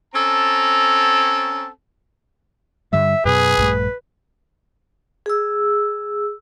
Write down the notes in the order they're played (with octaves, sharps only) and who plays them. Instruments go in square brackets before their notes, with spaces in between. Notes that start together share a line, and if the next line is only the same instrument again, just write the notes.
[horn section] C4 C#4 A4 A5 A#5
[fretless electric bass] G2 D3 G3 [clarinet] E5
[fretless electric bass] F#2 B2 [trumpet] G#4 [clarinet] B4
[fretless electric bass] A#1 G2 A3
[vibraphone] G#4 E6